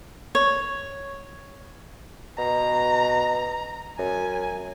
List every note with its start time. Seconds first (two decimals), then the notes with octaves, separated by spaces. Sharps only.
0.35 C#5
2.38 B2 A#5
3.98 F#2 G#5